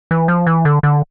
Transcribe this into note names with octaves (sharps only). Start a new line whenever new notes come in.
E3
F3
E3
D3
D3